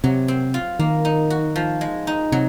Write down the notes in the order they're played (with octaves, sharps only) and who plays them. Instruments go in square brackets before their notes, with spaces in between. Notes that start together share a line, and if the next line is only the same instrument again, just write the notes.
[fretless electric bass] C3 [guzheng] F#3
[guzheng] C4
F4
[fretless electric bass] D#3 [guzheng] A#3
[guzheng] D#4
F#4
F3
G#3
D#4
[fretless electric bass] C3 [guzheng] F#3